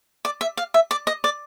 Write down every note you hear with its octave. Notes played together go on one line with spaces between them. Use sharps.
D5
E5
F5
E5
D5
D#5
D5